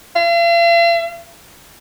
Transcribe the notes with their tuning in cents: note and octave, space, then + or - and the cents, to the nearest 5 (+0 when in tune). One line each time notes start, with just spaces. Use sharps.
F5 -45